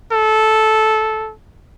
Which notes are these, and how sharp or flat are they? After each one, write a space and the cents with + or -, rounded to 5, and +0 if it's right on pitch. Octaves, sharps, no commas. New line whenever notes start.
A4 -10